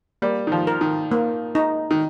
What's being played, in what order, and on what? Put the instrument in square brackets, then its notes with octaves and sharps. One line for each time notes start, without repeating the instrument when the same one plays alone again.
[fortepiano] G3 [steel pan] A#3
[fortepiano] D#3
F3
[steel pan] A#4
[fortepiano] D#3
[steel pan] A#3
D#4
[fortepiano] D#3